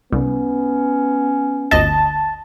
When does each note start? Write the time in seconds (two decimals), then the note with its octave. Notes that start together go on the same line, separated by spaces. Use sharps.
0.12 C2 B3 C#4
1.71 G1 D2 D#5 A5